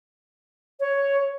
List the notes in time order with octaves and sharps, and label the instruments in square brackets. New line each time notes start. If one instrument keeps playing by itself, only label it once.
[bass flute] C#5